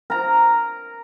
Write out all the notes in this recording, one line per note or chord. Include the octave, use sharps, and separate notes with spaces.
A#4 A#5